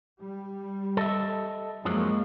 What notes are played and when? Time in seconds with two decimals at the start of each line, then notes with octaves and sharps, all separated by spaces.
0.20 G3
0.97 A4 D#5 E5
1.85 F#2 F3 F#3 G#3 A#3